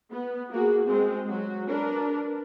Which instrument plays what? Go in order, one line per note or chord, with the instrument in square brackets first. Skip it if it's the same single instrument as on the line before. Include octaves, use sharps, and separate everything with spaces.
[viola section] B3
A#3 F#4 G#4
G#3 C4
F#3 F#4
D4 A#4 B4